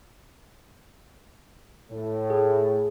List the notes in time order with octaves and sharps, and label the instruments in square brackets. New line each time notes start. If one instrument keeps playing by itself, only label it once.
[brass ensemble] A2
[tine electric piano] G#4